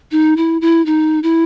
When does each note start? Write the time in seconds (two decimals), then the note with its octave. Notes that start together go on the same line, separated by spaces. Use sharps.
0.12 D#4
0.37 E4
0.61 E4
0.86 D#4
1.23 E4